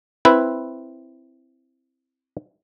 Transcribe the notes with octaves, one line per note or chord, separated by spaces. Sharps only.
C4 E4 B4